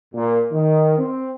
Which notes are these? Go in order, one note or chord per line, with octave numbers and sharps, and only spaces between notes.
A#2
D#3
C4